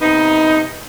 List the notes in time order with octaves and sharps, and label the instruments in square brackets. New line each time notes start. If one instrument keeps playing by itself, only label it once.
[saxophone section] C3 B3 D#4